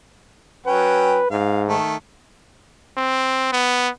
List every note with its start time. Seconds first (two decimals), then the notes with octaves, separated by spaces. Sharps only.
0.66 F#3 C#4 B4 G5
1.31 G#2 F5
1.68 D#3 A3
2.97 C4
3.53 B3